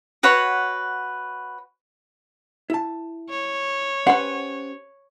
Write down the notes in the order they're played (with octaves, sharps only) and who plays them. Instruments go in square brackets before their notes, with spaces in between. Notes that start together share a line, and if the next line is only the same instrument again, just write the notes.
[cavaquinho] F#4 B4 C#5 F#5
[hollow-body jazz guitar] E4 A5
[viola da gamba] C#5
[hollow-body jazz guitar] C#4 G4 C5 [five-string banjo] B4 F#5